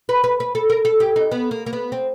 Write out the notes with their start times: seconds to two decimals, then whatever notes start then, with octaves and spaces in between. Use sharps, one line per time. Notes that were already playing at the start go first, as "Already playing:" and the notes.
0.09 B4
0.24 B4
0.40 B4
0.55 A4
0.70 A#4
0.85 A4
1.00 G4
1.16 D#4
1.32 B3
1.51 A#3
1.66 A#3
1.73 B3
1.92 C4